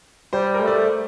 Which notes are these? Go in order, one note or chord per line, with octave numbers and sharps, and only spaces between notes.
G3 C5
A#4
A3
D5
C5